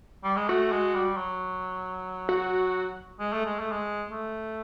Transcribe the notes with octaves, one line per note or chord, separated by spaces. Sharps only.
G3
G#3
A3 F#4
G#3
G3
F#3
F#4
G#3
A3
G#3
A3
G#3
A3